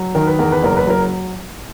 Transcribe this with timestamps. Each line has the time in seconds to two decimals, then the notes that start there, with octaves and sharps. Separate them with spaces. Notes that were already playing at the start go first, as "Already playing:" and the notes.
Already playing: F#3
0.15 D#3 A#4
0.27 B4
0.39 E2 A#4
0.52 B4
0.63 F#1 A#4
0.77 B4
0.87 F#3 A#4